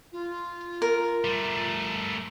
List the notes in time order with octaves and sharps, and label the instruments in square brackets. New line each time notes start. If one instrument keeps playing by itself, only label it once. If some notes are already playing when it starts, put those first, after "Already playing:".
[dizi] F4
[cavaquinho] A#4
[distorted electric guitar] G3 A3